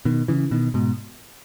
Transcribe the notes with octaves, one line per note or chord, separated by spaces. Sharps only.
B2 D#3
C#3 E3
B2 D#3
G#2 B2